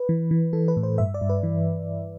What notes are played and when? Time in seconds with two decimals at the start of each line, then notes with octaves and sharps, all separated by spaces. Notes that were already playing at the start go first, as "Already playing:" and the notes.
Already playing: B4
0.09 E3
0.31 E3
0.53 E3 A4
0.68 B4
0.77 A2
0.83 C5
0.98 G2 E5
1.14 D5
1.21 G2
1.29 B4
1.43 E3